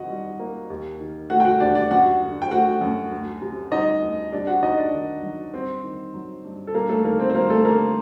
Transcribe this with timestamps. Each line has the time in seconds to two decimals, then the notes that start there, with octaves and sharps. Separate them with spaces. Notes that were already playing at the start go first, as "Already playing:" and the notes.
Already playing: F#2 D#3 C4 D#4 F#4 D#5 F#5
0.09 G3
0.39 A#3
0.70 D#2
1.00 D#3
1.30 A3 F#4 F#5
1.40 G5
1.45 F#4 F#5
1.60 D#2 D4 D5
1.75 D4 D5
1.91 F#2 F#4 F#5
2.21 D3
2.42 G5
2.51 A3 F#4 F#5
2.81 F#2
3.12 D2
3.42 C3
3.71 G3 D#4 D#5
4.02 D2
4.32 C2 D4 D5
4.47 F#4 F#5
4.62 C3 D#4 D#5
4.78 D4 D5
4.93 D#3
5.23 F#3
5.53 G2 C4 C5
5.84 D#3
6.14 F#3
6.44 G2
6.67 A4
6.74 G2 A#3 A#4
6.89 A3 A4
7.04 D#3 A#3 A#4
7.20 C4 C5
7.30 C5
7.35 G3 A#3 A#4
7.50 A3 A4
7.65 G2 A#3 A#4